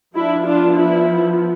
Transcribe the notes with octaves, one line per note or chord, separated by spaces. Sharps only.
F3 B3 D4 E4
D4 F4
E4